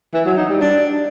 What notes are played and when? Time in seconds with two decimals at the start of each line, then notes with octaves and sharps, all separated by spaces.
0.14 E3
0.26 F#3
0.37 D#4
0.49 G3
0.61 D4